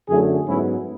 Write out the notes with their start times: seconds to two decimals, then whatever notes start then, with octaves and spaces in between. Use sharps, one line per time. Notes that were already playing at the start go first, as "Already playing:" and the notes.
0.09 F#2 D3 F#3 A3 E4 G#4
0.46 G#2 F#3 B3 C#4 E4